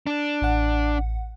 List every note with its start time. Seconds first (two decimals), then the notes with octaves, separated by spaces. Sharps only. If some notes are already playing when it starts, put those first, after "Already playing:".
0.07 D4
0.41 A1 F#5